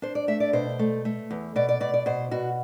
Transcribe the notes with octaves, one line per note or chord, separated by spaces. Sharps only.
D4 C5
D5
A3 E5
D5
B2 C5
A3
A3
E2
B2 D5
D5
B2 D5
D5
B2 C5
B2 F#4